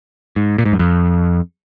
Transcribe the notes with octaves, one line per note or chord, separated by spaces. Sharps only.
G#2
A#2
G#2
F#2
F2